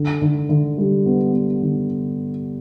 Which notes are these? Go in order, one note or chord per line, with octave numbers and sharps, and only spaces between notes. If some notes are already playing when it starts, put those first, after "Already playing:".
Already playing: D3
D3
D3
G3
B3
B3
D3